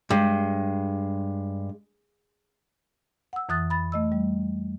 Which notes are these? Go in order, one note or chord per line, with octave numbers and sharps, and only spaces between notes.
G2 G#3
F#5 E6
F2 E3 D#6 F#6 A6
B5 A6
A3 D#5 E6
G3